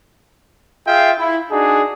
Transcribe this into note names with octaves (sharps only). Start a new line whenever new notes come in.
F4 G#4 E5 F5 G5
E4
D4 D#4 F#4 G#4